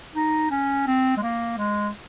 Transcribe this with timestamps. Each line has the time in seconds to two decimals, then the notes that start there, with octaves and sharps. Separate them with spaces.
0.15 D#4
0.51 C#4
0.87 C4
1.17 G#3
1.22 A#3
1.57 G#3